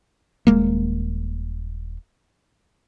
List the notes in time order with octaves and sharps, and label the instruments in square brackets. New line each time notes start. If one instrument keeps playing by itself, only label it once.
[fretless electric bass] D#1 G#3 A#3